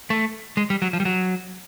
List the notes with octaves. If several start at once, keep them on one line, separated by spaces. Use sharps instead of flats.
A3
G#3
G3
F#3
F3
G3
F#3